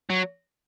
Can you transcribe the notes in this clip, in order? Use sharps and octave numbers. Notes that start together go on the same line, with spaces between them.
F#3